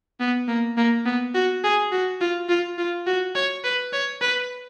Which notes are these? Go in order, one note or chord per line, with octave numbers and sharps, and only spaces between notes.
B3
A#3
A#3
B3
F#4
G#4
F#4
F4
F4
F4
F#4
C#5
B4
C#5
B4